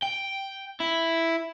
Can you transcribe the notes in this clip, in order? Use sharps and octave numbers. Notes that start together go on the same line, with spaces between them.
G5
E4